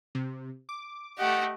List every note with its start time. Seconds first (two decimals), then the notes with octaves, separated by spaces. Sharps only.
0.15 C3
0.69 D6
1.18 A3 G4 D#5 F#5